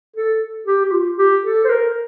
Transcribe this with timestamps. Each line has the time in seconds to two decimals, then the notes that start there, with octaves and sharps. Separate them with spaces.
0.16 A4
0.67 G4
0.85 G4
0.92 F4
1.18 G4
1.44 A4
1.65 C5
1.69 A#4